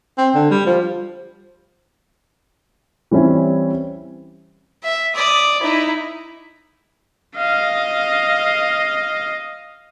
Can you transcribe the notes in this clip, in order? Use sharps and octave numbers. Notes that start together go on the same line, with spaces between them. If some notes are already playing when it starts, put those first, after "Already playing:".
C4
D3
G3
F3
E3 G3 C4 C#4 E4
E5
D5 D#6
D#4 E4
D#5 F5